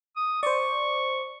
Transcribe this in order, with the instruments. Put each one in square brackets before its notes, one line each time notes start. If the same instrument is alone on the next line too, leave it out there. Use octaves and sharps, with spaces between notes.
[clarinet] D#6
[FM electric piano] C5 D5 [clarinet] C#6